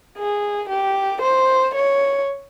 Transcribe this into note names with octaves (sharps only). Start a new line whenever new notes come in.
G#4
G4
C5
C#5